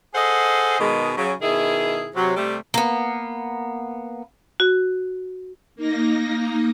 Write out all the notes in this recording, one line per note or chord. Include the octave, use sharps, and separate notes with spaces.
G#4 A4 C5 D#5 F#5
B2 D#3 G#3
C#3 F#3
B2 D#3 E4 G#4
C3 F#3
C3 G3 A3
A#3 B3
F#4
A#3 D#4 A#6